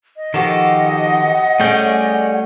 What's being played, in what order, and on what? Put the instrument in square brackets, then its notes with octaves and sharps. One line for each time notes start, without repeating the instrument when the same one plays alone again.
[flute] D#5
[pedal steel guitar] D#3 F3 [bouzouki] F#4 G4 A4 [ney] F#5
[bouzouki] G3 C#4 G#4 [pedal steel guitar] A3 G5